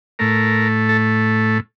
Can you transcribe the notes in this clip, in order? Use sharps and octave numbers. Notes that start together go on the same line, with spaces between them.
A2 A3 A#4
A4